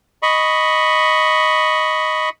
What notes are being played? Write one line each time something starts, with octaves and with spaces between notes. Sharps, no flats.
D#5 B5 C#6